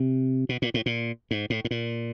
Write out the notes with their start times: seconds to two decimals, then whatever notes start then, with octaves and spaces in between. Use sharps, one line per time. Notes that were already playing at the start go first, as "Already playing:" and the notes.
Already playing: C3
0.49 B2
0.62 A#2
0.74 A2
0.86 A#2
1.31 G#2
1.50 A2
1.65 A2
1.71 A#2